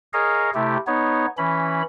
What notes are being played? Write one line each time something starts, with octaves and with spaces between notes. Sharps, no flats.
G#4 A#4 C#5 D#5 F5
C3 A3 E4 G4
B3 D#4 C#5
E3 C#4 B5